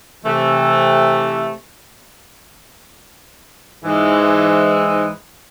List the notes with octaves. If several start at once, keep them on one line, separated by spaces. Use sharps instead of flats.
C3 E3 A3
G#2 E3 G#3